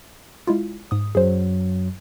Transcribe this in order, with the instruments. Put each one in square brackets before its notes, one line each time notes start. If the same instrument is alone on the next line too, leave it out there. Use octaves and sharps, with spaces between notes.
[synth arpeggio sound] G#3 E4 F4
G#2 D#6
[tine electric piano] F#2 F#3 [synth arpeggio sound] G#4 C5